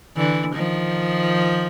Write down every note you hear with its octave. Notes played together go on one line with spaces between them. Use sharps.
D3 E3
D#3 F3